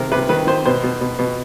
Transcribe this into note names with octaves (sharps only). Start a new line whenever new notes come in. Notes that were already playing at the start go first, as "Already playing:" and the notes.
Already playing: C3 D#3 A#4
C3 B4
D#3 B4
D#3 C5
B2 C5
B2
B2
B2